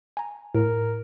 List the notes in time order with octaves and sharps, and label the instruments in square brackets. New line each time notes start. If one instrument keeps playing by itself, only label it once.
[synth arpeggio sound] G#5 A#5
[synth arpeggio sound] A2 [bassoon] A#4